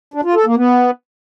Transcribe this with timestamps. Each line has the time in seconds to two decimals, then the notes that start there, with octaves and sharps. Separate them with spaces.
0.14 D4
0.24 F4
0.35 A4
0.46 A#3
0.56 B3